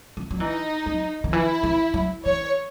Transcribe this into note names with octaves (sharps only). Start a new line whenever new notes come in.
D#3
F#3
E3 D#4
F#3
D#3
E3 E4
E3
F#3
E3 C#5